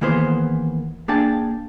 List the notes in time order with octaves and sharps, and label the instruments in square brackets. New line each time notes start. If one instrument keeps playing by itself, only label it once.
[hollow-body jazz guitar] D#3 E3 A#3 B3 G#4 C5
A#3 D4 G#4 G5 A5